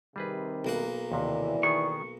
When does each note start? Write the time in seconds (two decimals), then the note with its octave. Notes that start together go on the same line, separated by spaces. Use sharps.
0.16 C3 D#3 G3 G#4 B4
0.65 B1 A#3 F#5
1.12 D#2 C3 E3 D5
1.63 D#3 B3 G#4 C#6